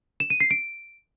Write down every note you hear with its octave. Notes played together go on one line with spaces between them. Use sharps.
E7
D#7
C7
D7